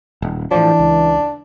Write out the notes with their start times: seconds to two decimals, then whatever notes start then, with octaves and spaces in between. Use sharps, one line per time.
0.22 D#1
0.51 A2 E3 F3 D4
0.79 C#2